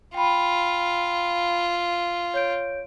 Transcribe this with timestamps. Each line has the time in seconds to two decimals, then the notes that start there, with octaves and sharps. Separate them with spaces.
0.14 F4 G5 B5
2.34 C#5 G6 D7